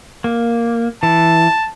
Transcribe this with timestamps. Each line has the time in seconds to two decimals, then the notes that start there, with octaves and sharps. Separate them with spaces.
0.24 A#3
1.03 E3 A5